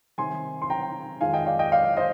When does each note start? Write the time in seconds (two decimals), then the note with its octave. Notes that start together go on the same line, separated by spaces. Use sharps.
0.18 C3 D#3 G3 G#5 C6
0.62 C6
0.70 G5 A#5
1.21 F2 D#3 G#3 F5 G#5
1.33 D#5 G5
1.46 D5 F5
1.59 D#5 G5
1.72 D5 F5
1.97 C5 D#5